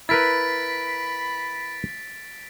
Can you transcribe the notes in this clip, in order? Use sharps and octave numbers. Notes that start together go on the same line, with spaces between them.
E4 A#4 B4 B5 A6 B6 D7